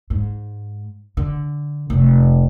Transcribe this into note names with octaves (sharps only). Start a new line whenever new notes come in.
G#2
D3
F1 C3